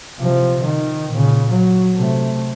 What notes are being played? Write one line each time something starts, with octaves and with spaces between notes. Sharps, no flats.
C3 F3
D#3
A#2 C#3
F#3
C3 A3